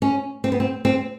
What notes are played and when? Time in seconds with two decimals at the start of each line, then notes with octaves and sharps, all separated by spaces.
0.02 C#4
0.44 C4
0.52 B3
0.60 C4
0.85 C4